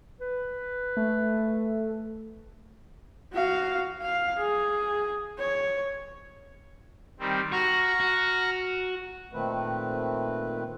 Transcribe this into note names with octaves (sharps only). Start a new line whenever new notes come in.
B4
A3
F#4 F5
F5
G#4
C#5
D#3 G3 C4
F#4 A#5 C#6 F6
F#4
A#2 D#3 A3 C4 B4